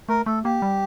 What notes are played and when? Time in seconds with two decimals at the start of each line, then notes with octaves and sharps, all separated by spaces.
0.09 A3 A#4
0.26 A3 A4
0.44 A#3 G4
0.62 G3